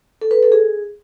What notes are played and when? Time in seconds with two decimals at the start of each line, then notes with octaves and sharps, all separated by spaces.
0.21 A4
0.31 B4
0.43 A4
0.52 G#4